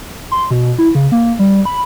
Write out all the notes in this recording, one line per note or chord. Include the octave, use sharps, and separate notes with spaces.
C6
B2
E4
C#3
A#3
G3
B5